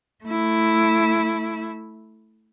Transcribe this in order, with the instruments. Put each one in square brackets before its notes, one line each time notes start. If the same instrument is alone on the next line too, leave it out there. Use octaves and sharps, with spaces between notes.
[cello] A3 E4